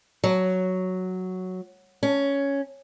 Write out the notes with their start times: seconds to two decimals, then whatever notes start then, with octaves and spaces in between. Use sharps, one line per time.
0.24 F#3
2.03 C#4